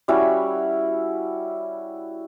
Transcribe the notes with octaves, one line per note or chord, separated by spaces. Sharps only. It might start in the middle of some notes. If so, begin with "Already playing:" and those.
G3 C#4 E4 F#4